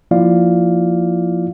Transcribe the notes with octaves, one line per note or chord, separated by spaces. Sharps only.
F3 A#3 E4 F4 D5 F5